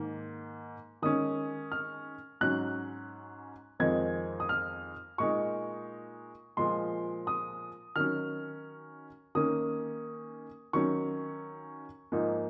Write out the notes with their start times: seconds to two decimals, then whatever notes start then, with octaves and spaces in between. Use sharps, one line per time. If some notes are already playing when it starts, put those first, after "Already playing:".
Already playing: G#2 D#3 A#3
1.02 D#3 G#3 C#4 D#6
1.72 F6
2.41 G#2 F#3 C#4 F#6
3.80 F2 D#3 G#3 C4 D#4 G#6
4.40 D#6
4.49 F6
5.18 A#2 G#3 D#4 C#6
6.57 A#2 F3 G#3 C6
7.27 D#6
7.96 D#3 F#3 C#4 F6
9.35 D#3 A#3 C#4 D#6
10.73 D#3 F#3 C#4 C#6
12.12 G#2 F3 A#3 D#4